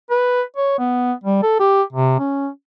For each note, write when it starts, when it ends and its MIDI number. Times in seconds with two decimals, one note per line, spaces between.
0.11 0.42 71
0.56 0.76 73
0.79 1.13 59
1.24 1.41 55
1.42 1.57 69
1.60 1.82 67
1.93 2.15 48
2.19 2.49 61